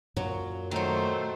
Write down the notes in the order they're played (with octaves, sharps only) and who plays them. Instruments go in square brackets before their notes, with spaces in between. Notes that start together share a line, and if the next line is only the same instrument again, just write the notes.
[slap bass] F#2 A#2 [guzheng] F#3
[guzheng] D#3 F#3 [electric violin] A3 C5